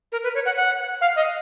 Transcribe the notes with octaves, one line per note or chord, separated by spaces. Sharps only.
A#4
B4
C#5
F#5
F#5
F5
D#5